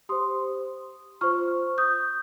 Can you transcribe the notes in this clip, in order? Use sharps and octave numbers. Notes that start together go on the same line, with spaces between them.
G4 C5 C6 D#6
F4 C5 C#6 F6
D#6 G6